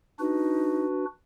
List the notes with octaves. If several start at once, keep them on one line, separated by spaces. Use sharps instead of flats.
D4 D#4 F#4 B4